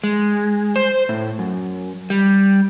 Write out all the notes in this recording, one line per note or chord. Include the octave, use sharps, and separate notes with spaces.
G#3
C5
A2
F#2
G3